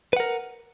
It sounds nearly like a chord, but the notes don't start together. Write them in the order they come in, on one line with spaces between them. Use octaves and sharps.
B4 F#5 A#4